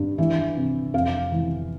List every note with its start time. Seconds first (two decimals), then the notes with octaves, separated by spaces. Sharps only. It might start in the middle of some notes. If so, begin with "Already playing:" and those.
Already playing: G2
0.18 E3 E5
0.57 C3
0.94 F2 F5
1.32 E3